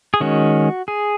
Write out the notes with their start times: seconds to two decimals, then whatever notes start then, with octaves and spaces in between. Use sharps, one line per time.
0.14 G#4
0.20 D#3 G#3 C#4 F#4
0.88 G#4